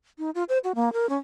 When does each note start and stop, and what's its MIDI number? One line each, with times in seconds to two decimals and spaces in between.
0.18 0.30 63
0.35 0.44 65
0.49 0.58 72
0.64 0.72 66
0.75 0.92 58
0.93 1.09 70
1.09 1.17 61